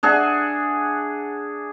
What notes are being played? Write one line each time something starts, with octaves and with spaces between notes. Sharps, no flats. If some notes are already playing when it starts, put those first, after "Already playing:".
D4 G#4 E5 F#5